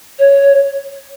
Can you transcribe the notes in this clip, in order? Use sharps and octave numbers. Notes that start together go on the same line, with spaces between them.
C#5